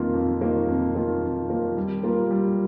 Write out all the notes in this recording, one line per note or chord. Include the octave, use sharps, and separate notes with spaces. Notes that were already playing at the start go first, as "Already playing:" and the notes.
Already playing: F2 D#3 A#3 F4
F2
D#3 A#3 F4
F2
D#3 A#3 F4
F2
D#3 A#3 F4
G3
A#3 F4 A#4
G3